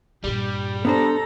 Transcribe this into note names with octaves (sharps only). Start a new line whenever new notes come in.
G2 A#2 G3 G4
B3 D4 A4 C5 A#5